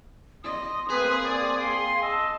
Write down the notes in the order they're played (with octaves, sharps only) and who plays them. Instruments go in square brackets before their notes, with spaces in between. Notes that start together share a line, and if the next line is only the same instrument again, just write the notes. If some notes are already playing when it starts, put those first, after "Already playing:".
[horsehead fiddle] D#5 [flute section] C6 D#6
[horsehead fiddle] A#3 C4 [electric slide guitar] G#4 [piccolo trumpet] B4
[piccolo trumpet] D5
[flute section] F5 G5 G#5 [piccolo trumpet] C6
[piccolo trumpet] D#5 [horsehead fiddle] A5 [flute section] C6 E6